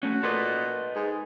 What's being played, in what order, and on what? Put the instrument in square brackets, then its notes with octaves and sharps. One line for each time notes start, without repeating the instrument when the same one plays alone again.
[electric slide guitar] A3 C#4 [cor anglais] F#4
[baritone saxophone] A#2 [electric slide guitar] A4 B4 D#5
[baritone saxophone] G#2 [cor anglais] G#4